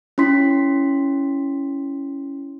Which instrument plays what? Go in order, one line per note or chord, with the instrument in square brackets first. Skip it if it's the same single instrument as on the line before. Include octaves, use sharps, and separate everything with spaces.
[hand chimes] C#4 E4 C6 B6